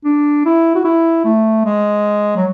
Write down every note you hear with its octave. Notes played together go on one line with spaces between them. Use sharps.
D4
E4
F#4
E4
A3
G#3
F#3